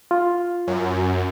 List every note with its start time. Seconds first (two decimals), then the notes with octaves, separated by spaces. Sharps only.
0.11 F4
0.67 F#2